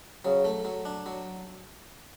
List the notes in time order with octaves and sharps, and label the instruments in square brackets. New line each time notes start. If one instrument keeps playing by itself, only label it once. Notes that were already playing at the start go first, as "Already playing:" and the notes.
[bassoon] C#3 [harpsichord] F#3
[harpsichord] A3
F#3
D4
F#3